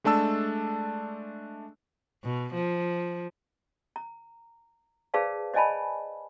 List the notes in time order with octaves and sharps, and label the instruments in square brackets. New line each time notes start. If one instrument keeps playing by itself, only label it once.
[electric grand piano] G#3 A3 D4 A5 E6
[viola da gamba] B2
F3
[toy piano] A#5
G#4 B4 C5 D5 F5 A5
C5 D5 D#5 G#5 A5 B5